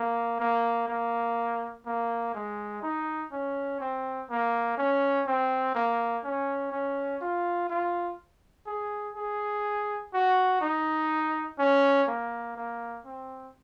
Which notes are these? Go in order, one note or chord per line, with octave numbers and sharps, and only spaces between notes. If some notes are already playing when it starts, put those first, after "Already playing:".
Already playing: A#3
A#3
A#3
A#3
G#3
D#4
C#4
C4
A#3
C#4
C4
A#3
C#4
C#4
F4
F4
G#4
G#4
F#4
D#4
C#4
A#3
A#3
C4